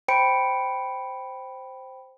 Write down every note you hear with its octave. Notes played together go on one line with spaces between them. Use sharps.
C5 G5 B5 C#7 D7